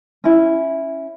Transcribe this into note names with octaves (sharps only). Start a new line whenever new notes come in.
C#4 E4